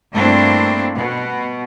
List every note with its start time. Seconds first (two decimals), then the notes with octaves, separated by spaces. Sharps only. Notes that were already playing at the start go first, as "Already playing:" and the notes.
0.15 G2 A3 A#3 C4 D4 E4
0.95 B2